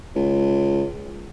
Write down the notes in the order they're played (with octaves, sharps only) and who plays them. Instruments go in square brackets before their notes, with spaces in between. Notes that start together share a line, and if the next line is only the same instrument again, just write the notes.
[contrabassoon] C#2